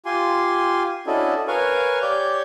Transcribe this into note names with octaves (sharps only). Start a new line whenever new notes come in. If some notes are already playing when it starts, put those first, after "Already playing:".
F4 G4 G#5 C6
C#4 D4 E4 F#4 A4 D#5
A#4 B4 C#5 F5 G#5 C#6
G4 C#5 D5 G6